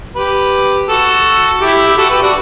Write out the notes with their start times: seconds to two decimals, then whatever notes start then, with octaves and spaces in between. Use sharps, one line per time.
0.16 G4 B4
0.89 F#4 A4
1.61 E4 G4
1.88 G4
1.98 F#4 A4
2.10 G4 B4
2.22 D4 F#4